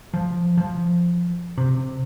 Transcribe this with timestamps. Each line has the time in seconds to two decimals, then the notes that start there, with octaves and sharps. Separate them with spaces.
0.14 F3
0.57 F3
1.58 C3